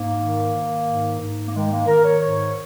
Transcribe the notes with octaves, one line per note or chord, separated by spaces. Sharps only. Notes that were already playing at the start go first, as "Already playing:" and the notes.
Already playing: G#2 A#3
D#3
D#3
G#2
G#2
A#3
D#3 G#3
A#3
D#3 A#4
C#5
G#2 C#5